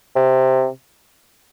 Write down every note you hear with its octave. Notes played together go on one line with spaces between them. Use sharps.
C3